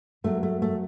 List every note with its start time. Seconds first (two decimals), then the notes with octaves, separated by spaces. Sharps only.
0.24 F#2 F#3 A3
0.43 A3
0.62 A3